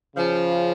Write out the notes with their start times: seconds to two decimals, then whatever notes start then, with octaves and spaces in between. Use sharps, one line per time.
0.16 C#3 F3